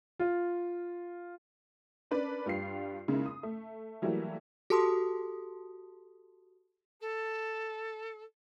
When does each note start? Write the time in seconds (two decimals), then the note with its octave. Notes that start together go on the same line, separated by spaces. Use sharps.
0.19 F4
2.11 C#4 D4 A#4 B4 D5
2.46 G2 G3 F4 C7
3.08 C#3 G#3 A#3 D#4 E4
3.26 D#6
3.43 A3
4.02 E3 F#3 G3 A3 A#3 E4
4.70 F#4 G4 A4 A5 C6 D#6
7.00 A4